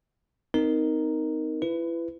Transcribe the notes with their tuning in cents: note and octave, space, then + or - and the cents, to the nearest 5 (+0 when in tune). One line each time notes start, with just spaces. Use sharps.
C4 -35 D#4 +0 A#4 +0
E4 +30 B4 +20